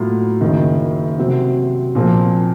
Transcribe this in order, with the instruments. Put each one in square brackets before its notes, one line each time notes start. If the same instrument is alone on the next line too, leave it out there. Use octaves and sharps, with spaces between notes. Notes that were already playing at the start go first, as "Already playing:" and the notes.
Already playing: [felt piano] A2 F#3 A#3 F4
F#1 F#2 D#3
C3 F#3 C4
A#2 F3 C4